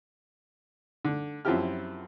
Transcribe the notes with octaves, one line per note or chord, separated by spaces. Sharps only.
D3
F#2 F3 C4 E4 G4 F6